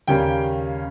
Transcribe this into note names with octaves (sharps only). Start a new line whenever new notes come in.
D#2 C#3 G3 A#3 C#4 G5